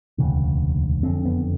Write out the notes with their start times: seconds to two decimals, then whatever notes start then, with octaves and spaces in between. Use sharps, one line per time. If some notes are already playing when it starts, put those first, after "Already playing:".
0.18 E1 D2 C#3
1.03 F#1 F2 D3 C4
1.25 B3